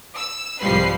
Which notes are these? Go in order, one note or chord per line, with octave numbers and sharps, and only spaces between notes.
E6
C2 G#2 F3 G3 B4 C7